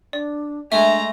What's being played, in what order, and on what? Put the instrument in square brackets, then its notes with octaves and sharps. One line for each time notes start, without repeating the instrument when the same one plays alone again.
[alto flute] D4 [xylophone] D5
[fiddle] G#3 A#5 [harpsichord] A3 [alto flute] D4 [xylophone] E5